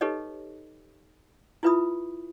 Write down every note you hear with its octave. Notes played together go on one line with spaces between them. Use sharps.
D#4 G4 A4 B4 C#5 D#5
E4 F4 B4 E5 B5 D#6